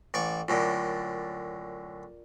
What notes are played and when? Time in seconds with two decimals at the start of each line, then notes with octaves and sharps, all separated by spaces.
0.14 A1 D5 C#6
0.48 F#2 A2 D3 F4 A#4 D5